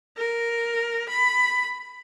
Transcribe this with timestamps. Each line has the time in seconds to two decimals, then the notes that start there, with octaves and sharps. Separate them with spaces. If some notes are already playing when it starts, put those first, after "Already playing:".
0.18 A#4
1.09 B5